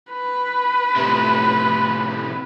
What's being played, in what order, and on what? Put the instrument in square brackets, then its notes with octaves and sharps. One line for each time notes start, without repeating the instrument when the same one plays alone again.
[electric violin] B4
[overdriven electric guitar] A2 C3